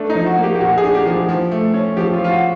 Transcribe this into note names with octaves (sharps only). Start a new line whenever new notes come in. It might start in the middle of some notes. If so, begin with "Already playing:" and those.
Already playing: A3 D4
D#4
F3
F#4
A#3
G4
G4
A#2 F#4
G#4
D4
G4
F3 G4
F3
A3
C#4
F3 G4
F4
F3
F4
F#4